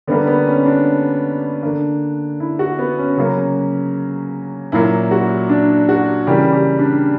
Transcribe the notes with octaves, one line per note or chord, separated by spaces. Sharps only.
D3 G3 A#3 B3
B3
C#4
D4
D3 A#3
E4
F#4
B3
C#4
C#3 F#3 A#3
A#2 F#3 A#3 E4
F#4
D4
F#4
C#3 E3 G3 A#3 G4
G4
D4